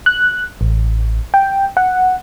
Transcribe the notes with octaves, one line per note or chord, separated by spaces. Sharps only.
F#6
A1
G5
F#5